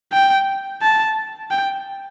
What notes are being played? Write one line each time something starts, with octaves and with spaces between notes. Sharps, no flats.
G5
A5
G5